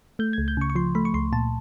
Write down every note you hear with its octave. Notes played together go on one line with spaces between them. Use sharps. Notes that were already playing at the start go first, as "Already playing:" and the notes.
A3 G6
C#2 G#6
G6
C#3 C#6
C#6
F3 C6
A3 B5
C#6
C#2 C6
A#2 A5